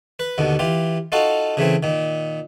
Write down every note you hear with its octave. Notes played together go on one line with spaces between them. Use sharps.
B4
D#2 B2 D3
E3 F4 G4
D#4 F4 F#4 A4 F5
C#3 E3 A3 C4
A#2 D#3